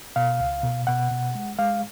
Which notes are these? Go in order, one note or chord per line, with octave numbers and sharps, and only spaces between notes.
B2 F5
C#2
B2
B2 F#5
B2
G#3
G#3 F5